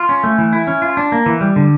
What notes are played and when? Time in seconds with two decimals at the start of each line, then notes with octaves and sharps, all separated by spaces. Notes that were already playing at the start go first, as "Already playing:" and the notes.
Already playing: F4
0.09 C#4
0.24 A3
0.38 E3
0.53 E4
0.67 C#4
0.82 F4
0.97 D4
1.12 A#3
1.26 E3
1.41 G3
1.56 D3